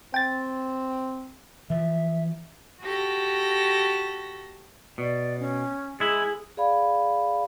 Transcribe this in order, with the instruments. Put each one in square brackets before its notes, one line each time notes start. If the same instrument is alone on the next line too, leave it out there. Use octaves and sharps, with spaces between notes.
[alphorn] C4 [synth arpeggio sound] G5 A6
[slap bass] E3 F3 [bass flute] E5
[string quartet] F#4 G4 A4 A#6
[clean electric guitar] B2 [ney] D5
[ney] C#4
[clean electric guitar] G#3 E4 [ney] G#4
[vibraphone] G#4 D5 F5 B5